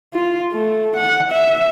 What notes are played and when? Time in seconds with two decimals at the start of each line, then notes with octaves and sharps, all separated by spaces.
0.14 F4
0.53 A3
0.97 F#5
1.32 E5